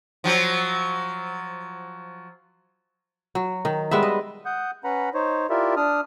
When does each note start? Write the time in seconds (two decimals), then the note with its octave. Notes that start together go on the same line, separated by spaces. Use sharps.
0.24 F3 F#3
3.35 F#3
3.65 D#3
3.91 G3 G#3 B3 E5
4.03 D#5
4.45 F#5 D#6 G6
4.84 C#4 B4 F#5 A#5 B5
5.14 D#4 C5 C#5
5.50 E4 F4 G4 A#4 D5 E5
5.77 D4 D#6 F6